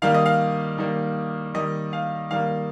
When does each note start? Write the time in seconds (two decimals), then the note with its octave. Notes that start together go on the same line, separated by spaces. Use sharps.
0.02 D#3 G3 A#3 F5
0.14 D#5
0.26 F5
0.78 D#3 G3 A#3
1.54 D#3 G3 A#3 D#5
1.93 F5
2.31 D#3 G3 A#3 F5